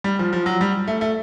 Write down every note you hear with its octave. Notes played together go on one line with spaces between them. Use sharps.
G3
F3
F3
F#3
G3
A3
A3